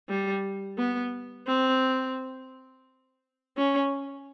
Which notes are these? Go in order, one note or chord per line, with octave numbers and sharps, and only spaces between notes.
G3
B3
C4
C#4